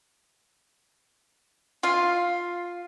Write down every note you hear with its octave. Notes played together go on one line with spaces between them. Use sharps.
F4 F5